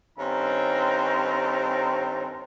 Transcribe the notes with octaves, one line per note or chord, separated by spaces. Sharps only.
G2 D#3 C4 C#4 A4 A#5